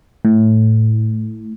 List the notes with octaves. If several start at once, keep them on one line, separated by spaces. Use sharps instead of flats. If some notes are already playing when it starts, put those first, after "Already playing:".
A2